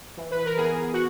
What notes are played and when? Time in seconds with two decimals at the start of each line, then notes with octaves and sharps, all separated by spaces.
0.17 E3
0.31 B4
0.45 A#4
0.57 B3 G#4
0.93 F#4